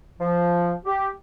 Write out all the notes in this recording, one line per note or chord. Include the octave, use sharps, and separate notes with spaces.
F3
G4